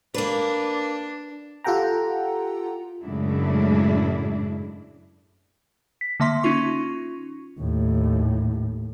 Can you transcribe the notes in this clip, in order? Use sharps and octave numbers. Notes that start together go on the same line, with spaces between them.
A#3 D4 B4
F4 G4 A4 F#5 G5 A#5
F#2 A2 C#3 G#3 D4 E4
B6
D3 A#3 E5 C6 B6
C#4 D#4 F4 C#6
D#2 A2